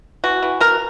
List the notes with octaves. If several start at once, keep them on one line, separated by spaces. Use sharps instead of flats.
E3 F#4
E3
B2 A#4